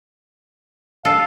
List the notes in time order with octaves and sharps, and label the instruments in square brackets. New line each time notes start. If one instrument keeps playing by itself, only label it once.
[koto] A4 [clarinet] F5